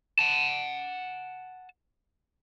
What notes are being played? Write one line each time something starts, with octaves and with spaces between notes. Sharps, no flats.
F#5 A5